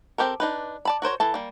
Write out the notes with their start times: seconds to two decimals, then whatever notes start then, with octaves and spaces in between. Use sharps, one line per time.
0.18 C4 G4 A4 A#4
0.40 D4 D#4 B4
0.85 D5 A5 B5
1.02 F#4 A#4 C5 C#5
1.20 E3 A4 A5
1.34 G3 A#3